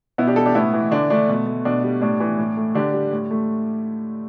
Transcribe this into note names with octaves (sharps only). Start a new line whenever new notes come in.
B2 B3 E4
D4 G4
G3 E4 A4
D4 G4
A2 B3 E4
E3
D3 D4
A3 D4
B2
A3
B2 D4
G3
A2 D4
E3
A2
A3
D3 D4 G4
G3
A2
A3